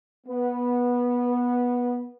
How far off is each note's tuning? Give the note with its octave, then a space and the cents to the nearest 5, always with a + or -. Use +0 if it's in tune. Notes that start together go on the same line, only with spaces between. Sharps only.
B3 -15